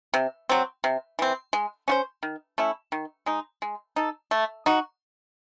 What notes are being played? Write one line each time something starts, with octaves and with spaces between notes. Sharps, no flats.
C3
F#3 C4
C3
E3 C4
G#3
C#4 F#4 C5
D#3
A3 C#4 E4
D#3
G#3 D#4
G#3
D#4 A4
A3
D#4 F#4